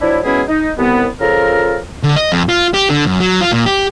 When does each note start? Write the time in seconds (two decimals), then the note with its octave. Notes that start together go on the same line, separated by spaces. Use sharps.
0.01 F3 F#3 D4 E4
0.25 F#3 G#3 B3 C#4 E4 G#4
0.49 D#4
0.78 C2 B3
1.21 C#3 F3 F4 A4 A#4
2.03 D3
2.16 D#5
2.32 F2
2.49 F4
2.74 G4
2.90 D3
3.07 F#2
3.20 F#3
3.41 F4
3.53 A#2
3.66 G4